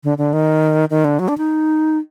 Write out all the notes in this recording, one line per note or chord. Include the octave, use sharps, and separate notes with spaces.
D3
D3
D#3
D#3
D3
F#3
D4
D#4